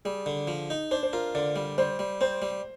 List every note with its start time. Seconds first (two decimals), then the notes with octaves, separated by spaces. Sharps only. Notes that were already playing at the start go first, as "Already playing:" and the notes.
0.05 G3 G#4
0.26 D3
0.47 F3
0.70 D#4
0.91 D4 C5
1.03 C5
1.13 F4 A#4
1.35 D3 D5
1.56 G3
1.78 G3 C5
1.99 G3
2.21 C4 C5
2.42 G3